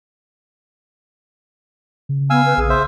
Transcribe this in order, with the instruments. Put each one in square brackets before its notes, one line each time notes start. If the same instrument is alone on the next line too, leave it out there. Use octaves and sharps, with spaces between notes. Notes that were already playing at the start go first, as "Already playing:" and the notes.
[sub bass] C#3
[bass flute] B3 [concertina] F5 G#5 E6
[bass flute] B4
[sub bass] A#1 [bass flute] G#4
[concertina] C5 E5